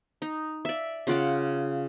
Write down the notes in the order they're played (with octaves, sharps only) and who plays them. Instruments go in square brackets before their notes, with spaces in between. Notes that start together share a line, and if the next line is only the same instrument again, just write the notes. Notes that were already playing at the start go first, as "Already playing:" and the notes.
[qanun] D#4
D5 E5
C#3 F4 F#5 D6